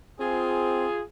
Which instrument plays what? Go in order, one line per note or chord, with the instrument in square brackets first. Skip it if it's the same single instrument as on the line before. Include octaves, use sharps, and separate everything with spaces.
[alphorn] C4 [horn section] F4 G#4